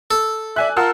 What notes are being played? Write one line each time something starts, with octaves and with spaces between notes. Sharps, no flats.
A4
D5 E5 G#5 F#6
F4 A#4 F#5 A5 E6